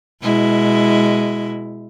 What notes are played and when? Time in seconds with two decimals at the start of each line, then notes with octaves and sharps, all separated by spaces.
0.22 B2 G#3 E4